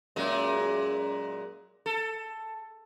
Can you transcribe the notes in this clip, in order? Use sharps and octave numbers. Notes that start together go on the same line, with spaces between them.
F#2 A#2 G#3
A4